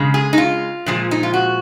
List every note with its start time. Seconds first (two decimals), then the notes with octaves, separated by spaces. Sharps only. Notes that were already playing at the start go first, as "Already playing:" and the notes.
Already playing: C#3 G#3
0.14 G#4
0.33 D#4
0.38 F4
0.86 A#2 F3 G#3
1.11 D#4
1.23 F4
1.34 F#4